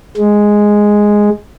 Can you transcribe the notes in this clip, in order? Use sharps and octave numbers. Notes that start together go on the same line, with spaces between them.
G#3